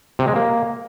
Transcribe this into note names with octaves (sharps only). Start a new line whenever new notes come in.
C3
G#3
A#3